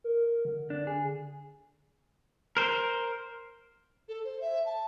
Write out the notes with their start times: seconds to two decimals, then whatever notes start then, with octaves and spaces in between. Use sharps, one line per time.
0.04 A#4
0.45 D3
0.70 D4
0.87 G#4
2.57 A#4 C5
4.08 A4
4.25 C5
4.41 E5
4.66 A5